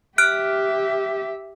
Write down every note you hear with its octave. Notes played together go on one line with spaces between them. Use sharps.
G4 E5 F6 F#6 D7